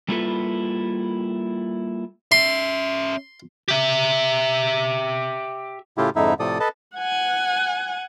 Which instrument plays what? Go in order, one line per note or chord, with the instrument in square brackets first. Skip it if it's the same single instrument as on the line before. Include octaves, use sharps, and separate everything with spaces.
[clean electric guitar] G3 A#3 E4 F4 A4 B4
[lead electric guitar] C#4 E5 [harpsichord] C6
[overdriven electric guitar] G4 E5
[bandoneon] A2 C#3 A3 E4 F4 G4
F2 G#2 D3 D#4 E4 E5
A2 C3 F3 A4 D5 D#6
A4 B4 D#5 A5
[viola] F#5 G#5